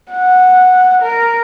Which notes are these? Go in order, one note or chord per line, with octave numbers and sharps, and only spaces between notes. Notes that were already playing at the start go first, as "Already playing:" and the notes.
F#5
A#4